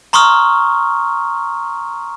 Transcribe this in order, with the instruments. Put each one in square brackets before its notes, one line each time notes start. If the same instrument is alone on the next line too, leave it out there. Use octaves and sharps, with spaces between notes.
[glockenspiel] A#5 C6 C#6 D#6 F6